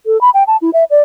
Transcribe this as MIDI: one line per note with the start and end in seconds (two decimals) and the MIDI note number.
0.06 0.20 69
0.21 0.30 83
0.34 0.44 79
0.47 0.57 81
0.62 0.70 64
0.73 0.84 76
0.91 1.02 74